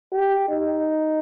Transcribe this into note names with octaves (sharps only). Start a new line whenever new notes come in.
G4
D#4